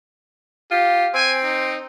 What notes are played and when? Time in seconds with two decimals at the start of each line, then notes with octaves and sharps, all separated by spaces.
0.71 F4 G4
1.14 C4 G#5
1.43 D#4